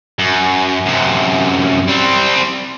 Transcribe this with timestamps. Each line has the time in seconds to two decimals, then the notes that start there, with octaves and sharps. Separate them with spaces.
0.19 F#2
0.86 F#2 C3
1.88 G3 C4